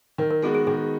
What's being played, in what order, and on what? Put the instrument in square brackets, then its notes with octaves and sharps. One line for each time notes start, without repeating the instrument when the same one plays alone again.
[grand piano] D#3 [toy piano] A#4
[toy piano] A#4
[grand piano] G#3 B3 F#4 [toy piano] G#4
[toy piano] G#4
[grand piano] D#3 [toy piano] G#4